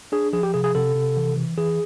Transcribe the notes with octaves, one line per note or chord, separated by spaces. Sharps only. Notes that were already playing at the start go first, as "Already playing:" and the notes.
D4 G#4
F3 G#4
G4
C3 G#4
G#4
C3 A4
C3
E3
E3
E3 G#4